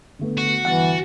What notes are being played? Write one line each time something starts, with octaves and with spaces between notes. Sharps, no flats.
D3 A3 B3
F#4
G1 E3 F#5 A6